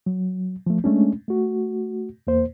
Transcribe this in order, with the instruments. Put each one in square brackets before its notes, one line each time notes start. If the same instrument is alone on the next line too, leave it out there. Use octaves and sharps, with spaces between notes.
[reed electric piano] F#3
F3 A3
G#3 A3 C#4 D4
A3 F#4
E2 A#3 C5